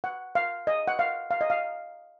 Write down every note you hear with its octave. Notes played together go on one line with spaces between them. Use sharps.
F#5
F5
D#5
F#5
F5
F5
D#5
F5